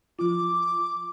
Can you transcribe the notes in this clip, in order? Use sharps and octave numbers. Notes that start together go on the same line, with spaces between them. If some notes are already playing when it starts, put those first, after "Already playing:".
F3 F4 D6